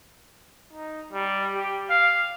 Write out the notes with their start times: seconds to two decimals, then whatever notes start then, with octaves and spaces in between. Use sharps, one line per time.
0.73 D#4
1.13 G3
1.55 G4
1.90 F5